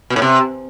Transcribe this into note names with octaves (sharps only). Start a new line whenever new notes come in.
B2
A2
C3